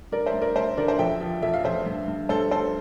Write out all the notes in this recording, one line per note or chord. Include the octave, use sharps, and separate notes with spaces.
G2 A#4 D5
C5 E5
G2
A#4 D5
G2 C5 E5
D3 A#4 D5
C5 E5
F2 E5 G5
F3
F2 E5
F5
F2 C5 E5
G2
G2
G2 A4 C5
G2 A4 C5